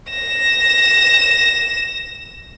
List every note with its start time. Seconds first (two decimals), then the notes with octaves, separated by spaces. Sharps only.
0.10 A#6 E7